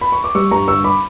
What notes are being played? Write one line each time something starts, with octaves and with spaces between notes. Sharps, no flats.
B5
C#6
D6
G3 C#6 E6
G2 A#5 C#6
D3 C#6 E6
B5 D6